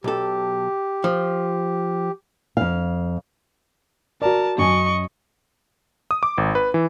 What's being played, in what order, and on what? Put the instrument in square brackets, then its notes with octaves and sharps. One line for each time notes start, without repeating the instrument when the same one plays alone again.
[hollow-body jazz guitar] B1 A4 [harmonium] G4
[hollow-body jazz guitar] F3
[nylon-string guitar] F2 F5
[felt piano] F#4 D5 [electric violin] A#4 A5
[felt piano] F#2 G#5 [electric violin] D#5 C#6
[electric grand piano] D#6
D6
G#1
B4
E3